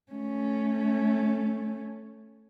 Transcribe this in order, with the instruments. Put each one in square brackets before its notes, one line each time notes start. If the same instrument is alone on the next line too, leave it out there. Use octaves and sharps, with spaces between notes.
[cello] A3 C#4